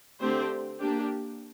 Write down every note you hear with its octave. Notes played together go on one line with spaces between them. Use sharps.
D3 A3 C4 G4 C5
A#3 D4 G4